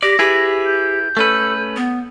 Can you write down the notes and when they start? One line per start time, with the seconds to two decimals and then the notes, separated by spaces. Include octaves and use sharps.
0.03 G4 D5 A#6
0.19 E4 G4 G#4 B4
0.66 G6
1.17 A3 C#4 A4 B4
1.76 B3